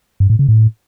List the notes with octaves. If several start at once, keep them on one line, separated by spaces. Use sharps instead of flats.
G2
A2
C#3
A2